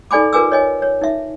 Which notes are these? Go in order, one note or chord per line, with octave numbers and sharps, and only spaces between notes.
D#4 A4 D5 G#5 B5 D6
F4 A#4 B4 G#5 D6 E6
C#5 D#5 G#5
C#5
D#4 E5